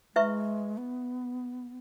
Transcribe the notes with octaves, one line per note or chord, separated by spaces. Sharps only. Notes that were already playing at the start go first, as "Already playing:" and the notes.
G#3 E4 B4 E5 C#6
B3